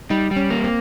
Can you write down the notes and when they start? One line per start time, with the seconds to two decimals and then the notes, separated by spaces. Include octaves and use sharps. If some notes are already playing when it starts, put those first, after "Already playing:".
0.10 G3 D#4
0.31 G3
0.36 C#4
0.50 A#3
0.64 C4